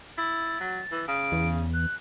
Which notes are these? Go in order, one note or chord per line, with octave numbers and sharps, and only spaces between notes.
E4 A6
F#3
E3
C#3 D7
E2
F#6